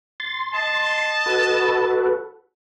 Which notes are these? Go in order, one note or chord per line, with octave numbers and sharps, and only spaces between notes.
C6 A6
D#5 A5
F#4 A4 B4